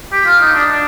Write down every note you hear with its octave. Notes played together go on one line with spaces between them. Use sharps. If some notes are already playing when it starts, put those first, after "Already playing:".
G4
F4
D#4
D4
D4